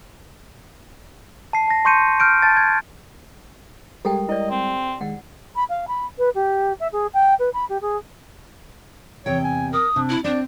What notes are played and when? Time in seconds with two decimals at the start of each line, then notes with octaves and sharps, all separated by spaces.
1.53 A5 C7
1.68 A5 A#6
1.85 A5 C6 C#6 G6 C#7 D#7
2.20 F6 G6 D7
2.42 A5 A6
2.57 G#6
4.05 G3 G#3 G4 A4 A#4 G5
4.29 E4 D5 D#5
4.50 C4
5.01 D#3 G#3 F#5
5.56 B5
5.70 F5
5.88 B5
6.18 B4
6.35 G4
6.80 E5
6.93 G#4
7.14 G5
7.39 B4
7.54 B5
7.69 G4
7.81 G#4
9.26 E2 C3 C#5 G5
9.44 G#5
9.73 A#4 D#6
9.96 C3 D4
10.09 E4
10.24 C4 D4 D5